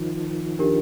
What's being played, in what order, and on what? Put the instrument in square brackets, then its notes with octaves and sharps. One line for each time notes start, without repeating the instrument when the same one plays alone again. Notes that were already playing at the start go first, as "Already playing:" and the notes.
Already playing: [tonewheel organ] D#3 F3
[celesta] D4 G4 A#4